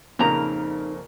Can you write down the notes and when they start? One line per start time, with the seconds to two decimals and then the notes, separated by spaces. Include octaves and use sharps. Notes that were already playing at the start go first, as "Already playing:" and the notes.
0.19 F2 A#2 C#3 D#4 A#4 A#5